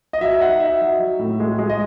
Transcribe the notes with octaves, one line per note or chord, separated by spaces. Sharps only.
D#5
F#3 E5
D#4 F#5
D#4 E5
F#3
F#3
A2
G#3
G#3
D#5